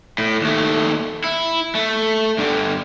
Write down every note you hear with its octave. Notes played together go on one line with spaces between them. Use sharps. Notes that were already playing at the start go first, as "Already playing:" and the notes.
A2
D#2 A3
E4
A3
G2 D3